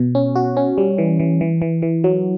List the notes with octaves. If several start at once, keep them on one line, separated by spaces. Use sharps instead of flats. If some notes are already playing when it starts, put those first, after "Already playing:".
Already playing: B2
C#4
F#4
C#4
G3
E3
E3
E3
E3
E3
F#3